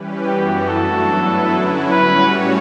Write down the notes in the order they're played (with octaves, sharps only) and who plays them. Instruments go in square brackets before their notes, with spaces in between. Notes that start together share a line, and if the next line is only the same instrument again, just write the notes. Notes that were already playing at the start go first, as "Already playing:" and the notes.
Already playing: [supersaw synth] E3 G3 C#4 G4 B4
[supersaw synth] F#2 E3 B3 F#4 [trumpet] G4
[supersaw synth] G2 F#3 A3 D4 F#4 [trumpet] A4
[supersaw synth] F#3 B3 E4 B4
D3 F#3 C#4 E4
[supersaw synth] A2 G3 C#4 F#4 C#5 [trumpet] B4